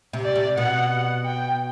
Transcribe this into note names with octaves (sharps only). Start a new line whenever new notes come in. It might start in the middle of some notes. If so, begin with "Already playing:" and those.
C3
D5
C3
B2 F#5
G5